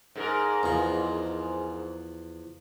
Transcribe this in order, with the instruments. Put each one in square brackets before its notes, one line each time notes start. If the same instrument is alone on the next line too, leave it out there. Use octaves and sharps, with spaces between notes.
[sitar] G#2 A4 A#4
[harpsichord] E2 F3